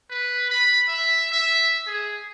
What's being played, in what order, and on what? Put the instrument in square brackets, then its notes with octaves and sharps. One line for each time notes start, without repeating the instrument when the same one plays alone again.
[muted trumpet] B4
B5
E5
E5
G#4